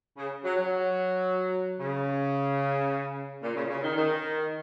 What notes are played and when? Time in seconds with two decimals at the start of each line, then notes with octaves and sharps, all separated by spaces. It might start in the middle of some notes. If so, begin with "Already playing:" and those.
0.17 C#3
0.44 F#3
0.57 F#3
1.80 C#3
3.43 A#2
3.56 C#3
3.65 A#2
3.69 C#3
3.83 D#3
3.97 D#3